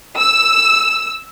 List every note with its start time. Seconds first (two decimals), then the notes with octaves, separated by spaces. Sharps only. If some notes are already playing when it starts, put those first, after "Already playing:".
0.18 E6